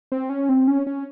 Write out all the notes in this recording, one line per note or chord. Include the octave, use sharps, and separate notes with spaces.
C4
C#4
C4
C#4
C#4